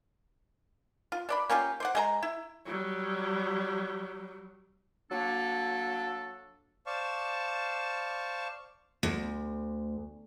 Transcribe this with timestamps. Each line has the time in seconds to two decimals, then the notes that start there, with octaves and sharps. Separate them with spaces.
1.12 F4
1.29 D4 D5 B5
1.50 A#3 C#4 F4 G4
1.80 C5 D5 F#5
1.95 G#3 A3 A#5
2.23 E4
2.66 F#3 G3
5.10 F#3 A#3 D4 A4
6.86 C5 D5 F5 A5 C#6
9.03 D2